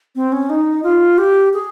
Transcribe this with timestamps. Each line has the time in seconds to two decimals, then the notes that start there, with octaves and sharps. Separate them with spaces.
0.16 C4
0.32 C#4
0.50 D#4
0.84 F4
1.18 G4
1.54 G#4